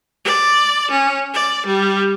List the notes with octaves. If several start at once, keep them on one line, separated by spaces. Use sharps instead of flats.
D5
C#4
D5
G3